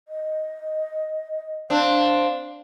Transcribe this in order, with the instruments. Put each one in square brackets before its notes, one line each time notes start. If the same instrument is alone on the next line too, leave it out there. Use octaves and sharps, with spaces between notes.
[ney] D#5
[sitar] C4 D4 [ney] F5